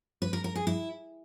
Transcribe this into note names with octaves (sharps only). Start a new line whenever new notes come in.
B4
A#4
A#4
G#4
E4